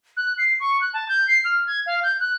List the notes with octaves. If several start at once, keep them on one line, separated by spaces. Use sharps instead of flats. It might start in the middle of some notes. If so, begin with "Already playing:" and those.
F#6
C7
C#6
F#6
A5
G6
C7
F6
G#6
F5
G6
F#6